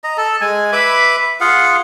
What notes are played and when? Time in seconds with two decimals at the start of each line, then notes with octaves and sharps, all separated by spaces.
0.04 D#5 A#5
0.18 A4 A5
0.41 G#3 G#5
0.73 B4 E5 B5 D6
1.40 F4 G#4 F5 F#5